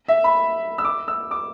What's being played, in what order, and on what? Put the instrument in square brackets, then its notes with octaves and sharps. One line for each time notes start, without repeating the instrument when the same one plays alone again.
[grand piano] E5
B5
E6
D6
E6
D6